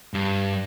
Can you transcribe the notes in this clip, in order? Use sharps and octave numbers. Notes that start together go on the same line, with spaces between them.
G2